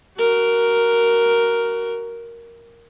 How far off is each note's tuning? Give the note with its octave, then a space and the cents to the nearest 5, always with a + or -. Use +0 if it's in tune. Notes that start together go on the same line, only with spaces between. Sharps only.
F#4 +20 A#4 +0